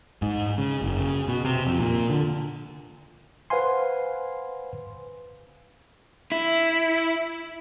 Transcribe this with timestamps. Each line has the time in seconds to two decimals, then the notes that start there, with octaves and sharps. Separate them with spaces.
0.22 G#2
0.58 C#3
0.82 F#1
1.00 C#3
1.28 B2
1.45 C3
1.67 F2
1.80 A#2
2.10 D3
3.50 B4 C5 F5 F#5 G#5 C6
6.32 E4